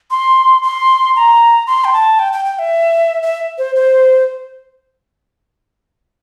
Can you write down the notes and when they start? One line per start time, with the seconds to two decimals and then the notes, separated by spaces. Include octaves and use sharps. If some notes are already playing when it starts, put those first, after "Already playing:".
0.11 C6
0.63 C6
1.16 A#5
1.67 C6
1.84 G5
1.93 A5
2.19 G5
2.33 G5
2.45 G5
2.59 E5
3.23 E5
3.58 C5
3.76 C5